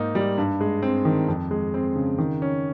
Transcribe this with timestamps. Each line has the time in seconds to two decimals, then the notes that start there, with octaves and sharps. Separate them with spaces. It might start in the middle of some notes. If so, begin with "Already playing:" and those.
Already playing: G#2 A#3 D#4
0.15 G3
0.38 G2
0.61 G#3
0.83 C4
1.05 D#3
1.28 F2
1.51 G#3
1.74 C4
1.96 C#3
2.18 D#3
2.42 C#4